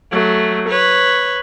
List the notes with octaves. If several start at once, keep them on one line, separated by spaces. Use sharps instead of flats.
F#3 A3
B4 C#5